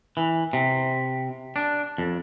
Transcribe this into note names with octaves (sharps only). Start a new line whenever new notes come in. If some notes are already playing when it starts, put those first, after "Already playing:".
E3
C3
D4
F2